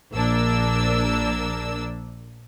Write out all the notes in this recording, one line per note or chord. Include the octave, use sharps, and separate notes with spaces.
A#1 A#3 D4 E6